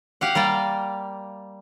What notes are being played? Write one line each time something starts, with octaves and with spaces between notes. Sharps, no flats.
G4 F5 F#5
G3 A#3 D5 G5